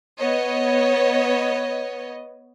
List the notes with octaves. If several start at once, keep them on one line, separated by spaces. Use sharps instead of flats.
B3 C#5 D#5